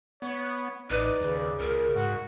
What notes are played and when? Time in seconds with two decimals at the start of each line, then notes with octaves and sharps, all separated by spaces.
0.22 B3 C#5
0.90 A1 D#4 B4 D5
1.21 D#2 C#3
1.60 C#2 A#4
1.96 G#2 F#4